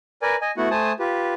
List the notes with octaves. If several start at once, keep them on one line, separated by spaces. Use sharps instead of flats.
A#4 B4 D5 G#5
D#5 G#5
A3 B3 E4 F#4 F#5
A3 C5 G#5 A5 D#6
F4 G4 B4